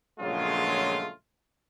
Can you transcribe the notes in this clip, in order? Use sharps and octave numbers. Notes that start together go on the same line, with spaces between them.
A#1 C#3 F#3 G#3 A3 F4